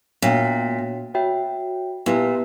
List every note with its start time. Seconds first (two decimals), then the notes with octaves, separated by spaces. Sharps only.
0.22 A#2 B3 D4 F#4 C#5 G5
1.14 F#4 C#5 E5 G5
2.06 A#2 B3 E4 G4 B4